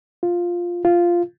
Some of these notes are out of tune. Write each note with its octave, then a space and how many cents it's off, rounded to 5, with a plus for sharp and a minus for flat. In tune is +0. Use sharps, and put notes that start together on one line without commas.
F4 +5
F4 -5